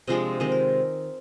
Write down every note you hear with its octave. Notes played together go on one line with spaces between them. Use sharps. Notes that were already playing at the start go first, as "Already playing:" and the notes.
C3 F3 G#3 D4 D#5
D#3 G#3 C4 D#5
A#4